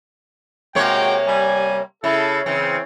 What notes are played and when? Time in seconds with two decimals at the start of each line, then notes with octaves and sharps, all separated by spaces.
0.75 C3 G#3 A#3 F#4 C#5 G5
1.27 G3 G#5
2.04 C#3 E4 A4
2.46 C#3 E3 C4